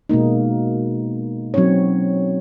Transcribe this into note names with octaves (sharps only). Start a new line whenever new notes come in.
B2 G#3 A#3 D#4
F#3 C4 C#4 D#4 C#5